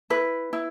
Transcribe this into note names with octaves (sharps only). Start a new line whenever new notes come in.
E4 B4
E4